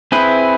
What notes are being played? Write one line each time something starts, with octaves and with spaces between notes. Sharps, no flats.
C4 E4 G#4 B4